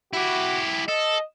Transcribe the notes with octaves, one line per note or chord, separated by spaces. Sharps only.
E4 F#4 G4
A4 D#5